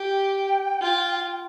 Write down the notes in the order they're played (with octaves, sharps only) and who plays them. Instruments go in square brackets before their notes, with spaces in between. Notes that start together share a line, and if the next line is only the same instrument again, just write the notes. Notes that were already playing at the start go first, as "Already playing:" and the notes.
Already playing: [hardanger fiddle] G4 [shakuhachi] G5
[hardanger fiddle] F4